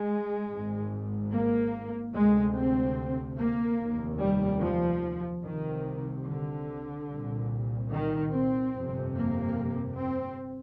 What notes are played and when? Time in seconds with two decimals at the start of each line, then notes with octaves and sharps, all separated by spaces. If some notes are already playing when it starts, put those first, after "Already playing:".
Already playing: G#3
0.49 G#1 G#2
1.31 A#3
2.13 D2 C3 G#3
2.56 C4
3.38 A#3
3.79 F1 D#2
4.21 G3
4.62 F3
5.44 C2 C3 D#3
6.27 D3
7.09 C2 A#2
7.92 D#3
8.33 C4
8.74 G1 F2 C3
9.16 A#3
9.99 C4